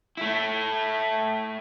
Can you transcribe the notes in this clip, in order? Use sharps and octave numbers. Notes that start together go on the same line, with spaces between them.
A3 E4